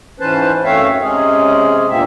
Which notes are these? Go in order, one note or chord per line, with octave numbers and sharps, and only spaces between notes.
G#2 E3 C#4 B4 C5 A5
F#2 A3 C4 C#5 E5 F5
C3 G#3 C#4 G#4
E2 G2 A#2 A#3 C4 E5